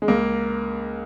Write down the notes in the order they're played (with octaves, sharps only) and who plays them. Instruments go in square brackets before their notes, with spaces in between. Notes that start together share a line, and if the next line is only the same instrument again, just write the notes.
[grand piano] G#3
C#2 A#3